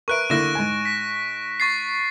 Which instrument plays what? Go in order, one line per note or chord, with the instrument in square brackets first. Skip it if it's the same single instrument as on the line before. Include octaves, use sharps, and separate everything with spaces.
[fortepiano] A#4 B4 E5 [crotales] C#6 F#6 D7
[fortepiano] D3 A#3 E4 [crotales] F#6 A#6 E7
[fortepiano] G#2 G#5
[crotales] B6
C#6 A6 C7